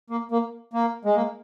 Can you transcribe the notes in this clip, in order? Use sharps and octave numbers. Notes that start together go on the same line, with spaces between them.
A#3
A#3
A#3
G#3
A#3